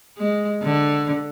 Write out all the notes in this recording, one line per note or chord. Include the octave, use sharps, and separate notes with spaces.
G#3
D3